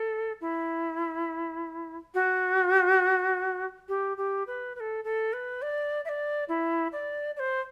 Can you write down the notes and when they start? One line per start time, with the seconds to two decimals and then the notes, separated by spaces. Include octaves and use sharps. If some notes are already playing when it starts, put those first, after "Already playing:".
Already playing: A4
0.41 E4
2.14 F#4
3.88 G4
4.17 G4
4.47 B4
4.75 B4
4.80 A4
5.04 A4
5.33 B4
5.62 D5
6.05 E5
6.08 D5
6.48 E4
6.92 D5
7.36 D5
7.39 C5